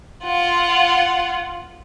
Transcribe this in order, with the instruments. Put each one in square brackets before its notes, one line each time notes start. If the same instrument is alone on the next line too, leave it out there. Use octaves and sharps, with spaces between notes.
[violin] F4 F#5